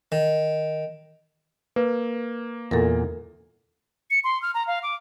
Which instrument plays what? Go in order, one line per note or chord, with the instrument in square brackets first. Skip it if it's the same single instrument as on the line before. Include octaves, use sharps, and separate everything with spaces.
[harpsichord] D#3
[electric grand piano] A#3 [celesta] B4
[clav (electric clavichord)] E2 A#2 [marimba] A4 A#4
[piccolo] C#7
C6
F6
A#5
F5
D6